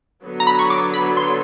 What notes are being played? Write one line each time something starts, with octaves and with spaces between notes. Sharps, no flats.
D3 F#3 B3
A#5
B5
C#6
D6
B5
C6